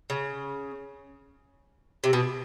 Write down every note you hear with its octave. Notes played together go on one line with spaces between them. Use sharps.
C#3
C3
B2